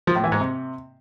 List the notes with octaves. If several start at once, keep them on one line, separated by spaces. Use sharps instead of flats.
F3
A2
E3
G#2
C3